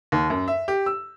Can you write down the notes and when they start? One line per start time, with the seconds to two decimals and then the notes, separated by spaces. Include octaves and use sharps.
0.12 D#2
0.30 F#2
0.48 E5
0.68 G4
0.86 E6